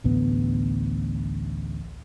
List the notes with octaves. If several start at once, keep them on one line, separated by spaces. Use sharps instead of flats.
A1 D2 A2 B3